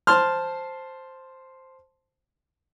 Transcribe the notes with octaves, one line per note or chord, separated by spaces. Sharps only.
C5 A5 C6 F6